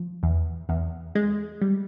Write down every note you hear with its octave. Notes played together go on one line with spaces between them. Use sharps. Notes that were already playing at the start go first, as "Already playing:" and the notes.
Already playing: F3
E2
E2
G#3
G3